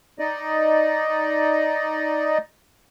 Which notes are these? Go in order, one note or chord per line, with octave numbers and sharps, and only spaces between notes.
D#4 D5 D#5